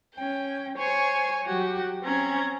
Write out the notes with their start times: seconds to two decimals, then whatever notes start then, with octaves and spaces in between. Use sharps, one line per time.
0.15 C#4 G5
0.78 C5 C#5 G#5 C#6
1.44 F#3 F#4 G4
2.02 C4 C#4 A#5 G#6